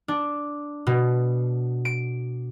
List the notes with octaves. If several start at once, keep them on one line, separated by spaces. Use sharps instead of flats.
D4
B2
D7